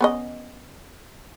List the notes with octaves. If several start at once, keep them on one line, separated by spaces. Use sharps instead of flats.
B3 C#4 D#5